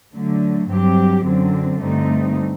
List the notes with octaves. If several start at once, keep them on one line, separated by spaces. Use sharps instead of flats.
D3 F#3 A3
G2 F#3 C4 G4
F#2 D3 F#3 C4
G2 D3 A3 C4 D#4